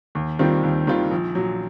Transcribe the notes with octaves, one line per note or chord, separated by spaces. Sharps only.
D#2
D#3 G3 C4 F4
D#2
D#3 G3 C4 F4
A#1
A#2 F#3